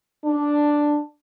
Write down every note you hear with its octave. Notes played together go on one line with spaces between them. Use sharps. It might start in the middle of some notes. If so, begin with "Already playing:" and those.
D4